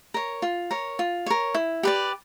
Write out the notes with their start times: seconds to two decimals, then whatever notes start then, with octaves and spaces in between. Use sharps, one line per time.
0.14 A#4 C#5
0.42 F4
0.71 A#4 C#5
0.99 F4
1.26 A#4 C#5
1.54 E4
1.83 G4 B4 D5